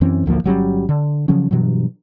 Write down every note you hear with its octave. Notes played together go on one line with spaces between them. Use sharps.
F#2 E3 C4 C#4
A1 D2 F3 A#3
G1 F#3 G3 C#4
D3
C#3 F3 F#3 C#4
G2 B2 E3 F#3